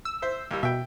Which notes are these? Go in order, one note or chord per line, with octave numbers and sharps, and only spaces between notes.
E6
C5 E5
D#2 G3
B2 E5 G5